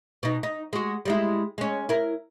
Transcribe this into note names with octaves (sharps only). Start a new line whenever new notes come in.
B2 D#4
D#4
G#3 F#4
G3 G#3 E4
G#3 C#4
E4 A#4